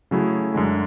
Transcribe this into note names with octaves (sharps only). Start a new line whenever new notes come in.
C#3 F#3 A3 E4 G#4
F#2 D3 G#3